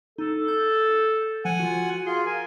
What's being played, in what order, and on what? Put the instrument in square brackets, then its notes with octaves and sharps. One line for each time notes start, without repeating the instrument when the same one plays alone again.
[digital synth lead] D#4 [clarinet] A4
[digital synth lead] G6
[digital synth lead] F3 [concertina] F#5 G#5
[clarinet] F4 [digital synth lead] F#4
[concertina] F4 G#4 [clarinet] C6
[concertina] A#4 [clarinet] G#5